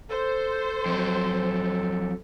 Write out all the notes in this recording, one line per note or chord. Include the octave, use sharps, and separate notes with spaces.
A4 C5
F2 F#3